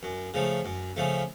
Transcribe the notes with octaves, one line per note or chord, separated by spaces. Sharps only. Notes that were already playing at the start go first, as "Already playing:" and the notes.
F#2
C#3 F3 A3
F#2
C#3 F3 A3